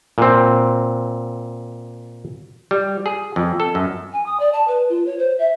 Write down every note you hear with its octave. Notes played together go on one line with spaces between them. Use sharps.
A#2 C4
G3
G#4
F2
A4
F#2
G#5
D#6
D5
A5
B4
F4
C#5
C5
E5